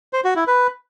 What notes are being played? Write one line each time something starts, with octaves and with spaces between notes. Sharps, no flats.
C5
F#4
E4
B4